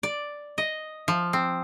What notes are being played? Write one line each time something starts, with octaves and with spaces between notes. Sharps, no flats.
D5
D#5
F3
C4